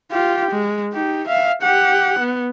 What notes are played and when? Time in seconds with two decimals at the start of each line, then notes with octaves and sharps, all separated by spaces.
0.11 F4 G4
0.50 G#3
0.93 D#4 G4
1.28 E5 F5
1.62 G4 F#5
2.19 B3